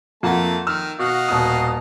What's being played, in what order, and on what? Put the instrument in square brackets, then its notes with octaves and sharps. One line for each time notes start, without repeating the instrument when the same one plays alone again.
[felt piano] F2 A#3 F#5 [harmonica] A3 A5
[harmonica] D#3 [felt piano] E6 F6
[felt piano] B2 [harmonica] F#4 D#5 F5
[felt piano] D#1 B2 D#6